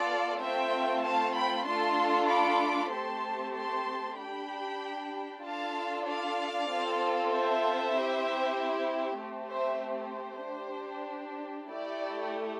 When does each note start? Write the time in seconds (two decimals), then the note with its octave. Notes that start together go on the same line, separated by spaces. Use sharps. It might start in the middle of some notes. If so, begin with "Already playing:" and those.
Already playing: B3 F4 A4 D5 F5
0.41 A3 C4 F4 E5 G5
1.04 F5 A5
1.35 G5 B5
1.66 A3 D4 F4 A4 A5 C6
2.29 B5 D6
2.92 A3 C4 G4 A5 C6
3.54 A5 C6
4.18 D4 G4 G5 B5
5.43 D4 F4 A4 F5 A5
6.05 D5 F5
6.69 C4 F4 A4
7.31 C5 E5
7.94 C4 E4 G4
9.20 A3 C4 G4
9.50 C5 E5
9.82 C5
10.45 D4 G4
11.70 A3 E4 G4 D5